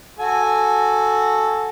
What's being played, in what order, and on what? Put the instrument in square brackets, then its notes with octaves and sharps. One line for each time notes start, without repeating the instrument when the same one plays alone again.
[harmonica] F#4 A4 G#5